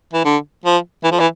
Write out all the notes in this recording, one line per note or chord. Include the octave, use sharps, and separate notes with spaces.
E3
D3
F3
E3
F3
E3